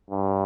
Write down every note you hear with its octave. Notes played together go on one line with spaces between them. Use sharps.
G2